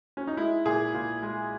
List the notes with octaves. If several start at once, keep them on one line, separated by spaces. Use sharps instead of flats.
C#4
D#4
G#3 E4
A#2 G#4
A#2
G#3